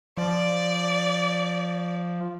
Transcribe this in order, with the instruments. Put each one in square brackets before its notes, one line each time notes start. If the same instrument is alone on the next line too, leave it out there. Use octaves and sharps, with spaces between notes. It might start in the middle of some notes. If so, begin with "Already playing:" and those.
[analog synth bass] F3 [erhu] D5